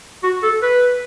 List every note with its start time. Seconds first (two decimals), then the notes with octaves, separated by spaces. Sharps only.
0.24 F#4
0.43 A4
0.62 B4